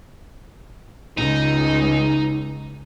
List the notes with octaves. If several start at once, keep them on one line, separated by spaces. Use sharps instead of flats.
C#2 D#4